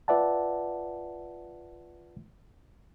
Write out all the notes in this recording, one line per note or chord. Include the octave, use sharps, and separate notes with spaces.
F4 B4 D5 E5 F#5 A5